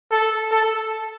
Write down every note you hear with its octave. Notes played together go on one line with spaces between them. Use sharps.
A4
A4